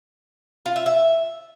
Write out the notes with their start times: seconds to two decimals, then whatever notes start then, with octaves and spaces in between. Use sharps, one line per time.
0.66 F4
0.76 E5
0.86 E5